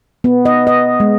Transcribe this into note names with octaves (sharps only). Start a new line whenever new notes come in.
B3
D#5
D#5
G#3